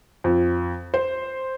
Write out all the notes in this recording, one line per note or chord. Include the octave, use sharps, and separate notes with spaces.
F2
C5